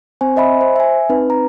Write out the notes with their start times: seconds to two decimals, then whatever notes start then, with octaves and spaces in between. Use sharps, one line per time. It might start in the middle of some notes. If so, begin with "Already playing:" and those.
0.21 C4 C5 G#5
0.36 C5 D#5 E5 G#5 B5
0.61 C5
0.76 E5 G#5
1.09 C4 D#4 B4
1.30 A#5